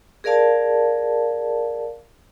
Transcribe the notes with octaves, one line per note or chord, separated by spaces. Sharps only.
G#4 A#4 D5 F5 A5